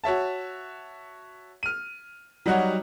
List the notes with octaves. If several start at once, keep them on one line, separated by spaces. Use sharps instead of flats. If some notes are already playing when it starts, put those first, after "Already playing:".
F#4 C#5 E5 A5
F6 D#7
F#3 G3 D#4 F#4 C#5 F#5